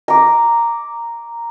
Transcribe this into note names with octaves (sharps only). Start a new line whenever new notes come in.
A#5 D6